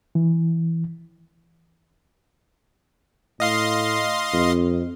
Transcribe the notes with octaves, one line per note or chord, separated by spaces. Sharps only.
E3
A2 D#5 F5 C6
F2